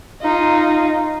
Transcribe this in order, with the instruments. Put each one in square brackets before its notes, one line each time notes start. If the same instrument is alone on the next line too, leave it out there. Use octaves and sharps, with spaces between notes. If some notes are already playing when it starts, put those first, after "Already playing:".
[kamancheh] D#4 F4